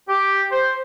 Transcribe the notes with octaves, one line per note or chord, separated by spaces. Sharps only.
G4
C5